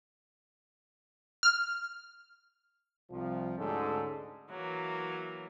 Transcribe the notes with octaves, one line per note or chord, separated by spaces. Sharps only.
F6
C2 F3
D2 G#2 C#4 D4 A4
E3 F#3 A#3